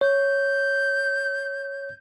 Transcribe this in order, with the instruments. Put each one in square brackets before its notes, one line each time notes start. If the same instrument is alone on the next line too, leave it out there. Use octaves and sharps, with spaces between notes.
[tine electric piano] C#5 [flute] G6